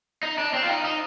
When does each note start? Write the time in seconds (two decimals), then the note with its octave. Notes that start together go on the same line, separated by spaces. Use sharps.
0.23 D#4
0.38 D4
0.54 C4
0.63 F4
0.69 D#4
0.85 D#4